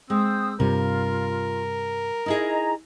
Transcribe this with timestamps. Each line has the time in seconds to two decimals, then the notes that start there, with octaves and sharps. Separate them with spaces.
0.10 G#3 C4 D#6 E6 G6
0.60 G2 C3 G3 F4 A#4
2.26 D#4 E4 G#4 D#5 A#5